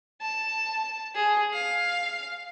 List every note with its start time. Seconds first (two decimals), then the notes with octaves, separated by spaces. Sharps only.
0.21 A5
1.15 G#4
1.53 F5